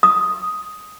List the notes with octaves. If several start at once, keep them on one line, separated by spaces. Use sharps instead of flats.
D#6